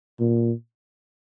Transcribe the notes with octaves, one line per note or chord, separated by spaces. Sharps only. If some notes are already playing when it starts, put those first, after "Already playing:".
A#2